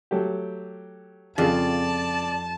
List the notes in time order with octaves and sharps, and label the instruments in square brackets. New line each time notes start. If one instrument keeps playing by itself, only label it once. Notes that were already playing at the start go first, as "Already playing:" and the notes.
[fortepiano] F#3 A3 G4
[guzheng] F2 [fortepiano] C#3 F4 G#4 [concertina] D5 [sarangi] A5